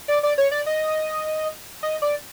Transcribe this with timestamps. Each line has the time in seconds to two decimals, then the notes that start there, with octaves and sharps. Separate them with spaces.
0.08 D5
0.23 D5
0.38 C#5
0.52 D5
0.66 D#5
1.83 D#5
2.02 D5